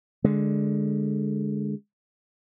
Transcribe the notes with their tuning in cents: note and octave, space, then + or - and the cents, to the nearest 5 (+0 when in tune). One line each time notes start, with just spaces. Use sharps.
D3 +0 G#3 +0